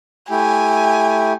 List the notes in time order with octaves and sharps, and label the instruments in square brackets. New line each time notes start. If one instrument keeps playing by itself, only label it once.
[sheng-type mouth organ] A3 E4 G4 [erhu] G#5